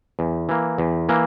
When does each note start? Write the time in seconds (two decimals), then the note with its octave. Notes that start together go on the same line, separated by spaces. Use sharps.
0.19 E2
0.49 E3 A#3
0.78 E2
1.09 E3 A#3